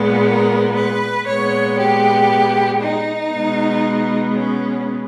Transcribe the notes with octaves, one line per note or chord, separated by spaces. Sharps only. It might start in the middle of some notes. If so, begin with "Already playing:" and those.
Already playing: A#2 G#3 B3
A#4
B4
A#2 G#3 B3 C#5
G4
D#4
B2 G#3 B3
C#4